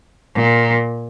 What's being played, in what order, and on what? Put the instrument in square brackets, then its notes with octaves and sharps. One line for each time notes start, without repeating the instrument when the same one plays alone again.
[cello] A#2